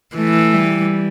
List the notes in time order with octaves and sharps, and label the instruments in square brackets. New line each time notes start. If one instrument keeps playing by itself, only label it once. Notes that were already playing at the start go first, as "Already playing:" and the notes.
[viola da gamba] E3 [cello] A3
[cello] G3